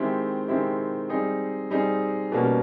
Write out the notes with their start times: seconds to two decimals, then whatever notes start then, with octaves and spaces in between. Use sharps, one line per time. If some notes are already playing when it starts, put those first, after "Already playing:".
Already playing: D#3 G#3 C4 E4 G4
0.48 D#3 G#3 C4 E4 G4
1.09 G3 C4 D#4 G#4
1.70 G3 C4 D#4 G#4
2.32 B2 G3 A#3 C#4 F#4